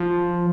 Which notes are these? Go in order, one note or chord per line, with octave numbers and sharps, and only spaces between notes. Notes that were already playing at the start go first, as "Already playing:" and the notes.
Already playing: F3